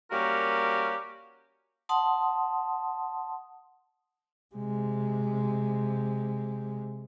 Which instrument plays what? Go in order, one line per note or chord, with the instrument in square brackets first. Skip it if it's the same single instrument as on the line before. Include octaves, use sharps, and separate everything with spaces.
[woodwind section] G3 A#3 C#4 F#4 G4 A#4
[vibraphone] F#5 A5 C6 D#6
[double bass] C3 G#3